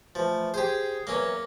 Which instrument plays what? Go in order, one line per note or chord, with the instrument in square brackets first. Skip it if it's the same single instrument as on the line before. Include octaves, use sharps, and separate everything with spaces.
[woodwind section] E3 A3 [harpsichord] F3
[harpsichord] G4 C5 [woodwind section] G#4
[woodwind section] E2 F#3 [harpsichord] A#3 C#4